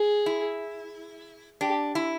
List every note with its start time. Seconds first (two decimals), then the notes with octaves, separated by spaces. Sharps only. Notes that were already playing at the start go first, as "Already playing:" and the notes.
Already playing: G#4
0.26 E4
1.61 D4 G4
1.95 E4